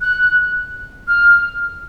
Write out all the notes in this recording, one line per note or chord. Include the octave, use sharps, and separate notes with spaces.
F#6
F6